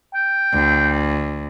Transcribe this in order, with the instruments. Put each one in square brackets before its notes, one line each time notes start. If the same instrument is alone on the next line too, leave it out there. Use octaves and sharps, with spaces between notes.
[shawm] G5
[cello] D2